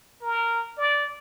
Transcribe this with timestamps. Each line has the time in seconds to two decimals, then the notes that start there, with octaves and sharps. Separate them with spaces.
0.22 A#4
0.78 D5